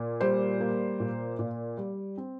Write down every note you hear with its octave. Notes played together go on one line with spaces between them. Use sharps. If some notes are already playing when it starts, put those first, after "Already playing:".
Already playing: A#2
G3 C5
A#3
A#2
A#2
G3
C4